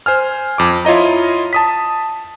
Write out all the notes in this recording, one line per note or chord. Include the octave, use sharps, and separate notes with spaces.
C5 G#5 F6
F2 D6
E4 F4 C#5 D#5 A#5
A5 D#6 B6